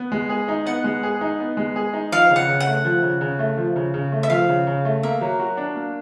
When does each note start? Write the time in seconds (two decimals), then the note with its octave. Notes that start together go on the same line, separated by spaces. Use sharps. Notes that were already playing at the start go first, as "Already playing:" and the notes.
Already playing: B3
0.12 G#3
0.29 G#4
0.48 D#4
0.66 B3 F#5
0.84 G#3
1.03 G#4
1.21 D#4
1.40 B3
1.57 G#3
1.76 G#4
1.93 D#4
2.12 F3 F5
2.30 C#3
2.36 F#5
2.48 C#3
2.60 F#5
2.67 A3
2.85 F3
3.03 C#3
3.21 C#3
3.39 A3
3.57 F3
3.76 C#3
3.94 C#3
4.12 A3
4.23 E5
4.30 F3 F5
4.49 C#3
4.67 C#3
4.85 A3
5.03 A#3 E5
5.21 F#3
5.40 F#4
5.57 D4
5.76 A#3